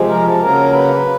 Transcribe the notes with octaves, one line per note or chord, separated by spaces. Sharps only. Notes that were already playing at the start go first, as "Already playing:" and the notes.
Already playing: C3 F3 G#3
A#4
A4
C#3 F#3 A#3 A#4
B4